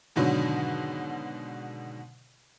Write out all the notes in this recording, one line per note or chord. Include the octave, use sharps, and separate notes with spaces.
G#2 B2 D3 D#3 F#3